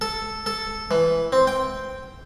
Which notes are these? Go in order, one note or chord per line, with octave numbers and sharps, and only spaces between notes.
A4
A4
E3
C4
G5